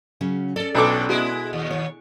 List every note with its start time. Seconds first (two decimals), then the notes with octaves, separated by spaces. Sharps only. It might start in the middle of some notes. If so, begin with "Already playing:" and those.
0.21 C#3 F#3 C#4
0.56 C#4 A4 D5
0.75 B1 A2 D4 A4 D6
1.09 B2 G#3 E4
1.53 D#2
1.71 C#5